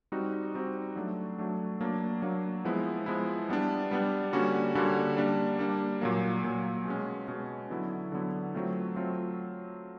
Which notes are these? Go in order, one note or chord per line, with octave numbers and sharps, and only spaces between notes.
G3 C4 D#4 F#4
G3 C4 D#4 F#4
F#3 A3 D4
F#3 A3 D4
F#3 A#3 D4
F#3 A#3 D4
F3 G#3 B3 E4
F3 G#3 B3 E4
G3 B3 D4
G3 B3 D4
D3 G3 A#3 C#4 F#4
D3 G3 A#3 C#4 F#4
G3 A#3 D4
G3 A#3 D4
A#2 F#3 A#3
A#2 F#3 A#3
B2 G#3 C#4
B2 G#3 C#4
D3 F#3 B3 E4
D3 F#3 B3 E4
F#3 A3 C4 F4
F#3 A3 C4 F4